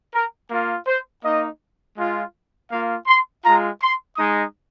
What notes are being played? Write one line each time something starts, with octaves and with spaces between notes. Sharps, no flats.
A#4
A#3 F4 A#4
C5
A#3 D#4 D#5
G#3 F4
A#3 F4 F5
C6
G#3 F4 A#5
C6
G#3 D#4 D#6